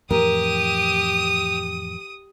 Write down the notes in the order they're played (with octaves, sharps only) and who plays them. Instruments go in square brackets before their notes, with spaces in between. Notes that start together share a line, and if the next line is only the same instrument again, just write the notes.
[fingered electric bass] F2 A2 E3 [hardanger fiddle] G4 [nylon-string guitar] A#4 [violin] D#6 D#7